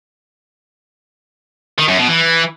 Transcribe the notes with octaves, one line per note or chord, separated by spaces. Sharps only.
D#3
F#2
B2
E3